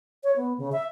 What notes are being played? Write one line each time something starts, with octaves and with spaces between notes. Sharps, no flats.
C#5
B3
C#3
E5